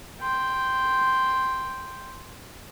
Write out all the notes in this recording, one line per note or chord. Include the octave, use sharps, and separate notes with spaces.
G5 C6